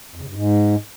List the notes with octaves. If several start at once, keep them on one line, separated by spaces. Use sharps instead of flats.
F2
C#3
G2
G#2